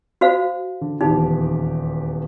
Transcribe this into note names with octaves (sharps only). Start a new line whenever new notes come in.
F#4 C5 F5
D3
D#1 E2 D#4 G4